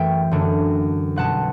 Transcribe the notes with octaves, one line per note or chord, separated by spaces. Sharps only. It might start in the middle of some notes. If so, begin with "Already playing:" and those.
Already playing: F#2 E3 A3 E4 E5 G5
F#2 D3 A3 D4
B1 B2 G3 F#5 A5